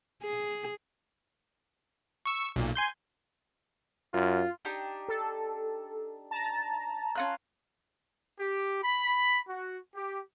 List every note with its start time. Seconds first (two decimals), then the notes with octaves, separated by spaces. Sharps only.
0.23 G#4
2.26 C#6 E6
2.56 B1 A#2
2.75 G#5 C6 G6
4.14 F#2 F4
4.65 D4 D#4 G4
5.08 A4
6.31 A5 A#5
7.15 C#4 F4 F#6
8.39 G4
8.82 B5
9.49 F#4
9.95 G4